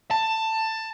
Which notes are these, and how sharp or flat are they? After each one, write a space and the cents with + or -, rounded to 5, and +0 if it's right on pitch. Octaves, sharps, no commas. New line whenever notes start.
A5 +15